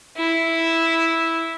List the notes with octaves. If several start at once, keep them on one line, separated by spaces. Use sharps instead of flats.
E4